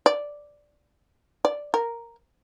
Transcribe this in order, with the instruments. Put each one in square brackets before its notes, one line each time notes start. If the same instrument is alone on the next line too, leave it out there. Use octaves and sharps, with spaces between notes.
[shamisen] D5
D5
A#4